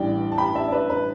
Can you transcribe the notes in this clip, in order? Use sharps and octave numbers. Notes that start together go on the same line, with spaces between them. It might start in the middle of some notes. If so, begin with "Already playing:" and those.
Already playing: A1 G2 E3 D5 G5
A5
G5 B5
E5 A5
D5
B4 E5
B4